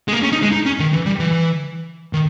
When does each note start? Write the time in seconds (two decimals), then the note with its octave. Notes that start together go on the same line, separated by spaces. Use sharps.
0.08 G#3
0.13 A#3
0.23 C#4
0.32 D#4
0.42 G#3
0.53 D#4
0.66 C#4
0.80 D#3
0.93 E3
1.06 G3
1.20 E3
2.13 D#3